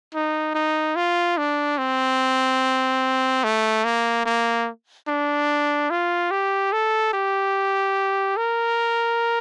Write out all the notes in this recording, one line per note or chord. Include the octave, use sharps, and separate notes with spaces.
D#4
D#4
F4
D4
C4
A3
A#3
A#3
D4
F4
G4
A4
G4
A#4